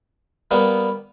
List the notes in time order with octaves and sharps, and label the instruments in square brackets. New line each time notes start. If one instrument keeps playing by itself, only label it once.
[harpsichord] G3 A#3 B3